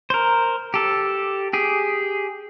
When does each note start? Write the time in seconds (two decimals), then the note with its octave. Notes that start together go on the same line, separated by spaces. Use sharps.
0.10 A#4 C5
0.74 G4 A4
1.53 G4 G#4